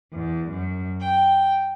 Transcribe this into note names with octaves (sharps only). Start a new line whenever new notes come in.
E2
F#2
G5